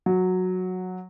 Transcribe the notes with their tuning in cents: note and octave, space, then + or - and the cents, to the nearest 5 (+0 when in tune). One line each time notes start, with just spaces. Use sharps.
F#3 -10